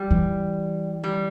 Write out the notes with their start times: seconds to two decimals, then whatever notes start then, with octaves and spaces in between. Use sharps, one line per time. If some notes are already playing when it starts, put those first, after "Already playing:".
Already playing: G3
0.11 E3
1.04 G3